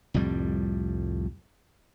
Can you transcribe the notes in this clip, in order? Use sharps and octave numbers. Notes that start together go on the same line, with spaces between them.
C2 F2 A2 G3